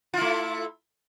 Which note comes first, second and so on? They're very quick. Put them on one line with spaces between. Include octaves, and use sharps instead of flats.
F4 E4 A3